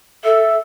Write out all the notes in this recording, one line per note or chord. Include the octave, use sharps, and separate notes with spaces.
A4 E5